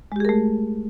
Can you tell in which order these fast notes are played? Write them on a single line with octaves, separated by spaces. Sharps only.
G#3 G4 G#4 A#4 A3